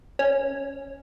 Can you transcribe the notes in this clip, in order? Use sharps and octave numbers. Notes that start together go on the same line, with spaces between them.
C#4